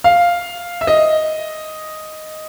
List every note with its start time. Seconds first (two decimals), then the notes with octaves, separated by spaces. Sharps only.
0.04 F5
0.81 E5
0.87 D#5